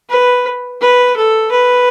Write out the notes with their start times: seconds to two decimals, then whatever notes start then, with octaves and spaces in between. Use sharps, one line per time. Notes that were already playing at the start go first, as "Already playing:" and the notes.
0.10 B4
0.81 B4
1.16 A4
1.52 B4